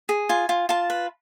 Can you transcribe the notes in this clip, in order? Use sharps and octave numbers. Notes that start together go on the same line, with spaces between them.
G#4
F4 G#5
F4
F4 A5
B4